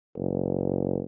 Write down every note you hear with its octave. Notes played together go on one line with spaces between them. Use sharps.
F#1